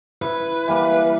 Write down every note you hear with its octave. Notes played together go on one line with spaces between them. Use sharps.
E4 B4
E3 G3 A#3